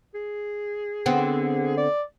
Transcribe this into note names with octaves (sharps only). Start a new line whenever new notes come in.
G#4
D3 B3 C4
D5